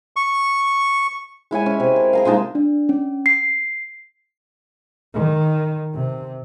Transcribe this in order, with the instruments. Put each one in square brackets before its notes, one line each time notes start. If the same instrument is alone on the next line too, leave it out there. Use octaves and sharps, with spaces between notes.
[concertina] C#6
[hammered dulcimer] G#3 E4 C#5 G#5
C#4
C3
A#4
G#4 A#4 F5
A#2 G#3 D#4 A5
[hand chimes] D4
C#4
C7
[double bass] D#3
C3